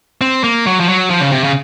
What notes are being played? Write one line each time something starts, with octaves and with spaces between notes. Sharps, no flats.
C4
A#3
F#3
F3
F#3
F3
C#3
C3
C#3